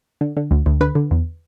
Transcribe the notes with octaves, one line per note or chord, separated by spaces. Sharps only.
D3
D3
D2
D2
D3 B4
D3
E2